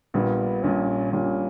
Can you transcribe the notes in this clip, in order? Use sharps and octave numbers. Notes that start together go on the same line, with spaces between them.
A#1 A#2 G3 B3
A#1 A#2 G3 C#4
A#1 A#2 G3 C#4